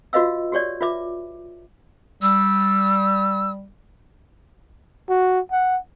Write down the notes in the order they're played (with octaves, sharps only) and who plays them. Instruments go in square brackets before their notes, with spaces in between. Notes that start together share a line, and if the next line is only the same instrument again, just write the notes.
[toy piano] F4 F#4 B4 D#5 F5 E6
F#4 G4 C#5 D5
F4 B4 E5 D6
[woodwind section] G3 [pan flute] E6
[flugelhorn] F#4
F#5